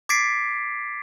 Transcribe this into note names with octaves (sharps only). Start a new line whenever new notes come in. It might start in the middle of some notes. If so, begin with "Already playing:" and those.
D6 G#6 A6 B6 C7 D7